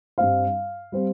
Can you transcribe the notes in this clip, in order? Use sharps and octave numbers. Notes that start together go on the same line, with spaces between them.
G2 G3 C4 F5
G3 C4